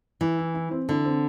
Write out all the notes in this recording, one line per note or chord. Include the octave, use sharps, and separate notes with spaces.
E3 E4
E4
E4
C4
D3 E4
C4